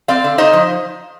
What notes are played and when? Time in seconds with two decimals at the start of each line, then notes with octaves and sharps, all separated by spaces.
0.08 C4 D5 F5
0.24 D3
0.38 D#4 C5 D#5
0.53 F3